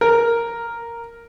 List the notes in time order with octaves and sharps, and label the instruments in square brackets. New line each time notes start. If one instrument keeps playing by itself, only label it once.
[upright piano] A#4